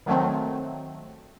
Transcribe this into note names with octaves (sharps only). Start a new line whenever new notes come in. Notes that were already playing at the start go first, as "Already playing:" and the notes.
D#3 F#3 A3 C4